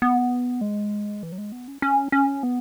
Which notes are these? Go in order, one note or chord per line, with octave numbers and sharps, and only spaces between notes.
B3
G#3
E3
F#3
G#3
B3
C#4
C#4
C#4
B3